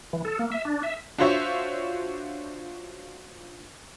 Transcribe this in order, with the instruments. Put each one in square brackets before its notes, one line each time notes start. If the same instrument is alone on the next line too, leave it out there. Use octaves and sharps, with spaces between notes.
[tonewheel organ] E3
A4
A#3
E5
D4
E5
[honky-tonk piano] D4 F4 F#4 C5 C#5 E5